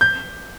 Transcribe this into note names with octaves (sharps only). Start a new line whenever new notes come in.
G6